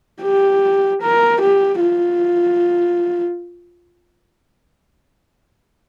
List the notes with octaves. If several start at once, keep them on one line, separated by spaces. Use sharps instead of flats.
G4
A#4
G4
F4